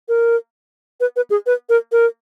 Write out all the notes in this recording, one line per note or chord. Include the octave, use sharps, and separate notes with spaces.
A#4
B4
B4
G#4
B4
A#4
A#4